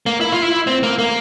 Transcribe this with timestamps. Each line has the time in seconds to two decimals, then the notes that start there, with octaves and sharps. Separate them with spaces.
0.06 A#3
0.21 E4
0.32 F4
0.42 E4
0.67 C4
0.83 A#3
0.99 A#3